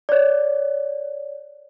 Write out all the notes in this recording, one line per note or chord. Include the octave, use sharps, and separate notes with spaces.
C#5 D5